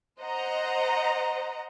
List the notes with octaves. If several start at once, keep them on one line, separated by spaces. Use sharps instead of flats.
C5 D#5 F#5 A#5